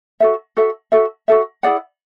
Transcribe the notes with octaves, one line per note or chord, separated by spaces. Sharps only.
F#4 A4 E5
F#4 A4 E5
F#4 A4 E5
F#4 A4 E5
E4 G#4 D5 F#5